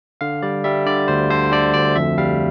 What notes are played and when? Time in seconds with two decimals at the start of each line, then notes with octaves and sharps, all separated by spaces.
0.21 D3 F5
0.42 G3 D5
0.64 G3 E5
0.86 D3 D5
1.08 D2 C5
1.30 D3 C5
1.52 D3 D5
1.74 D2 D5
1.96 F2 E5
2.18 G3 F5